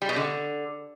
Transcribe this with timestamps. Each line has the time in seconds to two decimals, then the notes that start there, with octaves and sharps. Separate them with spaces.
0.02 G3
0.09 B2
0.16 D3